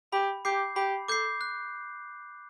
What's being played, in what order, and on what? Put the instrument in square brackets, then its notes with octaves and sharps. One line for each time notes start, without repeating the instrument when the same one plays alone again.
[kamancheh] G4 [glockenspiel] B5
[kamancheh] G4 [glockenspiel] D6 G6 C7
[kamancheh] G4 [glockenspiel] B5
[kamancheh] A4 [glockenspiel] D6 G6 C7
[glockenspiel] F#6